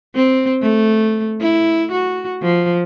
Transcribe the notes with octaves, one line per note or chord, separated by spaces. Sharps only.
C4
A3
E4
F#4
F3